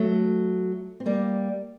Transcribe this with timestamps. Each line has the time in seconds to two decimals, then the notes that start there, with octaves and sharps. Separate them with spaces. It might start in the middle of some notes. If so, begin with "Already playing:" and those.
Already playing: F#3 A3
1.00 C4
1.06 G3 A#3